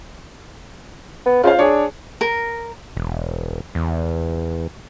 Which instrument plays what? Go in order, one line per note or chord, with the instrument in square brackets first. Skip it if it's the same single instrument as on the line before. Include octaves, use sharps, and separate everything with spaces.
[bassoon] B3
[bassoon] C#3 [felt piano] F4 C5 F5
[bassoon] D4 [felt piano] G#4 C#5
[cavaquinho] A#4
[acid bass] E1
E2